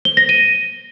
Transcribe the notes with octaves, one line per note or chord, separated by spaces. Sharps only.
G7
A#6
D#7